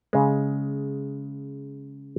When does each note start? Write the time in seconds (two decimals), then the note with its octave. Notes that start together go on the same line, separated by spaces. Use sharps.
0.13 C#3 G#3